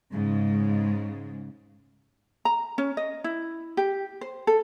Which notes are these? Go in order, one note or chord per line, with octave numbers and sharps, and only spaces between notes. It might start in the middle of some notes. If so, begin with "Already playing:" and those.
G#2 C#3 G#3
A#5
C#4
D#5
E4
G4
C5
A4